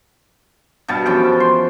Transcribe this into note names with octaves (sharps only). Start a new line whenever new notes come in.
G2 B2 G3 A5
F#2 E3 F3 G5
C6